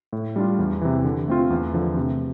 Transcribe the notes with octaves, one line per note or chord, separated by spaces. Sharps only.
A2
G3 D4 F4
E2
C3 E3
D3
A3 C4 F4
E2
D3 F3 A3
C3